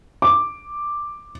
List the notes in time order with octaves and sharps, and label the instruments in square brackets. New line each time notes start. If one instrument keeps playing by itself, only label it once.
[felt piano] D6